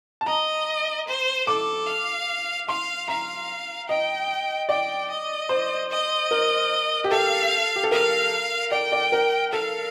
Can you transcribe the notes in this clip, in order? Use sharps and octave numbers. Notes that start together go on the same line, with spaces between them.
A5
D#5 A#5
C5
A4 D6
F5
F5 C6
F5 A#5
D#5 G5
D5 G5
D#5
C5
D#5
A#4
G4
A4 F5
G4
A4
A#4 F5
D5 G5
D5
A#4
A4 F5